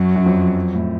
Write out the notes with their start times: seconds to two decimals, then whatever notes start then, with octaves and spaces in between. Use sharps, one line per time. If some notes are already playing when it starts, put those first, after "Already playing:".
Already playing: F#2 F#3
0.16 F#2
0.26 F2
0.75 A2